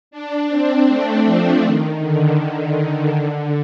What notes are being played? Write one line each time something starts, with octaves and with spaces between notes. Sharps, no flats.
D4
C4
A3
F3
D#3
D3
D#3
D3
D3